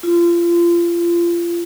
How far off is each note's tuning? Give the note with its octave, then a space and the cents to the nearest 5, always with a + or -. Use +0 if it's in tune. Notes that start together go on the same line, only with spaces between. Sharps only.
F4 -30